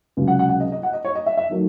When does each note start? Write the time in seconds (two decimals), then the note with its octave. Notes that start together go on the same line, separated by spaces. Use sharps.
0.17 C#2 C3 F#3 C#4
0.28 F#5
0.39 F#5
0.49 F#5
0.60 D#5
0.72 D#5
0.83 F#5
0.93 D#5
1.04 C#5
1.15 D#5
1.26 E5
1.37 E5
1.49 D#3 F#3 A3